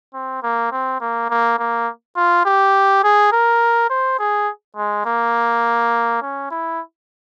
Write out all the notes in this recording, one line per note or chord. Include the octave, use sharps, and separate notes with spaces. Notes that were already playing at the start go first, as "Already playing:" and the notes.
C4
A#3
C4
A#3
A#3
A#3
F4
G4
G#4
A#4
C5
G#4
G#3
A#3
C#4
E4